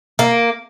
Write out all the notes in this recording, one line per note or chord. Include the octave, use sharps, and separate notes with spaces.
A#3